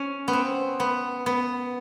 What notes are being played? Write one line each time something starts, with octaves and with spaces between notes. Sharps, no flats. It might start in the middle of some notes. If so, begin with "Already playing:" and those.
Already playing: C#4
B3
C4
B3
B3